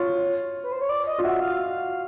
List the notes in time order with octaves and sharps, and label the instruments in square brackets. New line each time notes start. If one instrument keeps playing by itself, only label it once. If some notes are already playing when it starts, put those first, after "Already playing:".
Already playing: [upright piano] F4 [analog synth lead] C#5
[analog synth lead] B4
C5
C#5
D5
D#5
[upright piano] F4
[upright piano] F#4 [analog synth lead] E5
[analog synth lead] F5